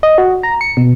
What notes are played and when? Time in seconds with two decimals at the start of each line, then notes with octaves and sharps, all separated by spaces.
0.03 D#5
0.18 F#4
0.43 A#5
0.61 C#7
0.77 B2